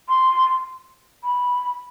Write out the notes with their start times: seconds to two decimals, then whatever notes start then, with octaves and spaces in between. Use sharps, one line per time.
0.09 C6
1.23 B5